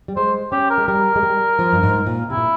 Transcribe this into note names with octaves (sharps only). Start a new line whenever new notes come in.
G3
G#3 C5
C#4 G4
A#4
G#3
G3 A#4
G#3
G3
F3
G2
G#2
A#2
C3 E4
A#2